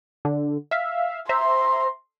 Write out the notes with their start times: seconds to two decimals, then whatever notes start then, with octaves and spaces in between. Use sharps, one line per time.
0.25 D3
0.71 E5 F5
1.29 C5 E5 A#5 C6